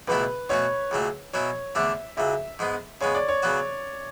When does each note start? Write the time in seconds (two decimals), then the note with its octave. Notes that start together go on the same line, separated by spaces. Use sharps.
0.08 C#2 B2 F#3 A3 E4 B4
0.49 B2 A3 C#4 F#4 C#5
0.91 C#2 C#3 F#3 A3
1.33 B2 F#3 C#4 E4 C#5
1.75 E2 D3 A3 D4 E5
2.17 C#2 C#3 F#3 E5
2.59 G#2 G#3 B3
3.01 C#3 G#3 B3 C#5
3.15 D5
3.28 C#5
3.43 C#3 F#3 B3 F#4